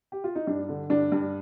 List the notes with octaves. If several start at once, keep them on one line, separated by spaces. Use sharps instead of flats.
G4
F4
D#4
G2 D4
D3
G2 D4
G2